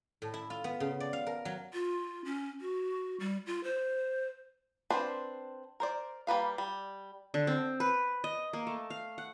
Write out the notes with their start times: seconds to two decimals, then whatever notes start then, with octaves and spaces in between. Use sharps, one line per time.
0.22 A2
0.34 E4
0.50 F4
0.64 B3
0.80 C#3
1.00 D5
1.13 F5
1.27 A#4
1.45 F#3
1.74 F4
2.25 C#4
2.61 F#4
3.20 G3
3.46 F4
3.64 C5
4.90 C4 D4 B4 C5
5.80 A#4 C5 D5
6.27 G3 A#3 B4 F5
6.58 G3
7.34 D3
7.47 C4
7.80 B4
8.24 D#5
8.53 A#3
8.67 A3
8.90 F5
9.18 F#5